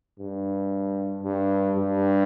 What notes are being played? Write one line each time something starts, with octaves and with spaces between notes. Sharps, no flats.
G2
G2
G2